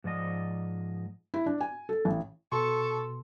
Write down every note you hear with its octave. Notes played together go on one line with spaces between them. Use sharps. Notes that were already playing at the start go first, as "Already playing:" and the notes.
G#2 F3 D5 D#5
E4
D4
G#5
A4
A1
B2 A4 C6 C#6